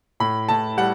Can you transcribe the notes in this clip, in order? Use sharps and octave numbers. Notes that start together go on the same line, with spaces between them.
A2 B5
A2 A5
G3 F#5